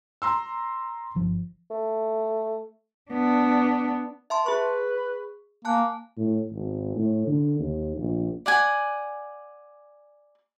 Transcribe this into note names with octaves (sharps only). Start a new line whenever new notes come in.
A#5 C6 E6
G1 F3
A3
B3 D4
E5 A5 C6
G#4 B4 C#6
A#3 G#5 A5 F#6
A2
G#1
A2
D3
D#2
A#1
D5 F#5 G#5